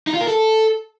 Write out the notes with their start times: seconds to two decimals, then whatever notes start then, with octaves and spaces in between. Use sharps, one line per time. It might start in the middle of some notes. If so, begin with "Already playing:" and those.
0.07 D#4
0.14 F4
0.21 A#4
0.27 A4